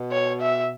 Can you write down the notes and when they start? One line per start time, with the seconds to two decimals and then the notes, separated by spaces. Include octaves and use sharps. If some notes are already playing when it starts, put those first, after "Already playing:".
Already playing: B2
0.12 C#5
0.42 E5